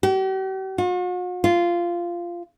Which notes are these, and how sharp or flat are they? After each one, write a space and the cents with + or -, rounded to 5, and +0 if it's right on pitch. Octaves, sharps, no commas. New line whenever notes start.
G4 -45
F#4 -45
F4 -10